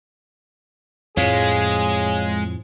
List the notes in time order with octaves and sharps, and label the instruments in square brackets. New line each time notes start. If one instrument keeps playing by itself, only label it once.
[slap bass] F2 A2 F3 [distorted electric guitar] G#3 [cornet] G#4 [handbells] C#5 F5 B6